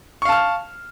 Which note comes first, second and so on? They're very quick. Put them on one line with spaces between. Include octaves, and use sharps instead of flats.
C#6 F5 A5 F6